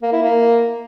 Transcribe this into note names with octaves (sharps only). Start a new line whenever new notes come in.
A#3
E4
A#3